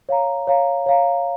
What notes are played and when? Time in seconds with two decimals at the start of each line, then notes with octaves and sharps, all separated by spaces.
0.09 C#5 F5 A#5
0.47 C#5 F5 A#5
0.86 C#5 F5 A#5